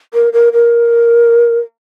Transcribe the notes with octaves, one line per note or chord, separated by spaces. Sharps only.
A#4
A#4
A#4